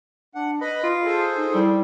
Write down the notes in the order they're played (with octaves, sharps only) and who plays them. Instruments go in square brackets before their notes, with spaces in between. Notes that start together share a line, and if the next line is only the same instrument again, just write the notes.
[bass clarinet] D4 [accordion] F#5
[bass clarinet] B4 [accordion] D#5 B5
[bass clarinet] F4
[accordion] G#4 A4 C5
[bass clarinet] D#4
[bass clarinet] G3 [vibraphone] E4